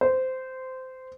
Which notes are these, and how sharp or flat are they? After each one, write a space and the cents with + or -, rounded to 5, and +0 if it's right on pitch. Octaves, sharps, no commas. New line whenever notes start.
C5 -15